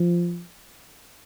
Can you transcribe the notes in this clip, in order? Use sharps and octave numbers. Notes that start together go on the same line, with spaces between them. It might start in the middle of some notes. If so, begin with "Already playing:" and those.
Already playing: F3